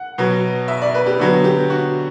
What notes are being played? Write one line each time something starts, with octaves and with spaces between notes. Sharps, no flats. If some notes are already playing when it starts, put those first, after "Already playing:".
Already playing: F#5
B2 F#3 B3
E5
D5
B4
G4
D3 F#3 B3 F#4
G4
F#4